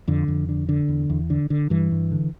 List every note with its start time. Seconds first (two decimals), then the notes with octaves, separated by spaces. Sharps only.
0.08 F2 D3
0.28 F2
0.49 D3
0.69 D3
0.88 E2
1.10 E2
1.30 D3
1.50 D3
1.70 G2 E3
1.92 G2
2.11 D3